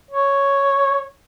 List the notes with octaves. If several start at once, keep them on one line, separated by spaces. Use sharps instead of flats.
C#5